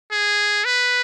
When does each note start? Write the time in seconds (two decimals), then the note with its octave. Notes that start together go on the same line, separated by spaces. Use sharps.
0.12 G#4
0.65 B4